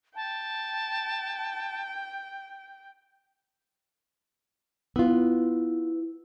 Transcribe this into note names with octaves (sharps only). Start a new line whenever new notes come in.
G5 A5
B3 E4 F4